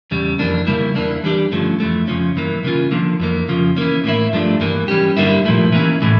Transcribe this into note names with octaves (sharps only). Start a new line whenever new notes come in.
E2 C#3 G3
F2 E3 A#3 D4
C#3 G3 A#3 E4
E2 E3 A#3 D4
E3 G3 D4 G4
G2 D3 F3 A3 C#4
F2 E3 A3
F2 C#3 F3 C#4
G2 E3 A#3
C#3 E3 A#3 C#4 F4
D3 F3 A#3
F2 E3 A#3
F2 C#3 F3
E3 A#3 C#4
A2 E3 A#3 E4
G2 F3 A3 D4
G2 E3 A#3
E3 G3 C#4 G4
G2 D3 G3 A#3 E4
A#2 F3 A3 E4
E3 A#3 C#4 E4
A2 E3 A3